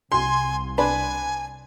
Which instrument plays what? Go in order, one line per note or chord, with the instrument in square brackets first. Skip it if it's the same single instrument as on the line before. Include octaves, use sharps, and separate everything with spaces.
[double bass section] C2 [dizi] G#5 [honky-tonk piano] C6
[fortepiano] D4 B4 [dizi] G#5